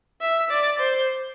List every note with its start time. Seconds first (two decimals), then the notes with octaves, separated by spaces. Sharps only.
0.21 E5
0.50 D5
0.79 C5